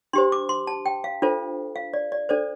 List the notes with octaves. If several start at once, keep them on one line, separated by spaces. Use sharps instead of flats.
D4 G4 C5 C6
D6
C6
A5
G5
F5
D4 F4 A4 C5
F5
D5
D5
D4 A4 C5 D5